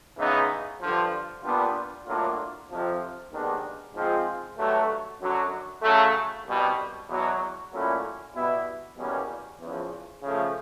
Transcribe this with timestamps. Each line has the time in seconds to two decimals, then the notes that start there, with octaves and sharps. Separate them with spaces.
0.18 C#3 E3 G#3 B3 D#4
0.81 G2 D3 F3
1.43 A#2 G3 B3 D4 F4
2.06 A2 F#3 A#3 D4 F4
2.70 F2 C3 F3
3.32 D#2 D#3 G#3 B3 D4
3.94 G#2 F3 G#3 C4 F4
4.57 G2 D3 F#3 A3
5.21 F#2 D3 F#3
5.83 C#3 F#3 A3
6.45 C2 B2 G3
7.09 E2 B2 F#3
7.72 A#2 F#3 A3 C#4 E4
8.34 B2 G3 B3 E4
8.97 E2 B2 G3 A#3 C#4
9.60 E2 C#3 F3
10.22 C#3 F3 A3